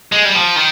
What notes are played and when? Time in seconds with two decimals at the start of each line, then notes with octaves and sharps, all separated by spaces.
0.12 G#3
0.25 G3
0.35 F3
0.56 D#3